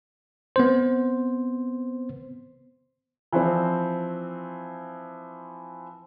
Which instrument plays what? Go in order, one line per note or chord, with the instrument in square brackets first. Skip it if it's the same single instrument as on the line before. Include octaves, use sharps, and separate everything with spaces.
[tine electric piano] B3 C4 C5
[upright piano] E3 F3 C4 C5